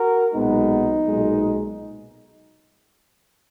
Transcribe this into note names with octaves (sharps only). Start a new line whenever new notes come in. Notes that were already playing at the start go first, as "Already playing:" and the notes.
Already playing: F#4 A#4
B1 A#2 G#3 B3 D#4
B1 A#2 G#3